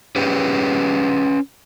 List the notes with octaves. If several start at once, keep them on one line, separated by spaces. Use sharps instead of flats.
C#4 G4 G#4 B4